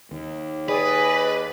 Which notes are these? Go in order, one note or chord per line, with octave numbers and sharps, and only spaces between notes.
D#2
G#4 B4 D5 D#5